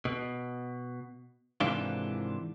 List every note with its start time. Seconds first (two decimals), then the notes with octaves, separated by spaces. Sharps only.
0.05 B2
1.60 G#2 C3 D#3 E3 D4 F4